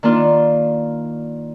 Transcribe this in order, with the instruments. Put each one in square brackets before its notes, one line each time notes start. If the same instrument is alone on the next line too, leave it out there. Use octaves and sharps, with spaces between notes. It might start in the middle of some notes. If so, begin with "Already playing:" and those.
[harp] D#3 A#3 D4 F4